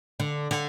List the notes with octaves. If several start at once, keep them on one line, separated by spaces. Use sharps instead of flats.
D3
D3